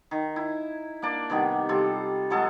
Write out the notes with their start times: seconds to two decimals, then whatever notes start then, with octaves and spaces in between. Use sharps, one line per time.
0.11 D#3
0.36 E4
1.02 A#3 D4 D5
1.30 C3 D#3 G3 B3
1.69 C3 G3 F4 A4
2.30 F3 F#3 G#3 A4